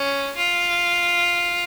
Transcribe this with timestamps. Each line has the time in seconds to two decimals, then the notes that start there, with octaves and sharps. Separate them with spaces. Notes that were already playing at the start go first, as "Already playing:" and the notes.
Already playing: C#4
0.37 F4